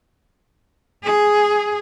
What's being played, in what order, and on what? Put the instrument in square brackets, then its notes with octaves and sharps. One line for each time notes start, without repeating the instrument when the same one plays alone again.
[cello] G#4